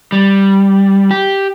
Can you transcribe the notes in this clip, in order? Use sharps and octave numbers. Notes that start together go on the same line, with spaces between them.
G3
G4